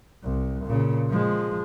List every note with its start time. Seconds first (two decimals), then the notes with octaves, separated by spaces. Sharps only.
0.23 C2
0.66 A#2 C#3
1.10 F3 G#3